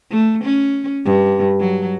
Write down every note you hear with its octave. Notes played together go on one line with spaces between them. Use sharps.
A3
C#4
G2
F#3